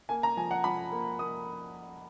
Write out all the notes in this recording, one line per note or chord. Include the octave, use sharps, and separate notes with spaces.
A#3 G#5
A#5
F3 G#5
F#5
F3 B5
A#3
A#3 D#6